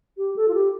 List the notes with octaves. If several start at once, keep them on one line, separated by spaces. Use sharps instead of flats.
G4
A4
F4
G4